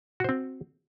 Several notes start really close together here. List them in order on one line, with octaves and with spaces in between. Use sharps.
F#4 C5 C4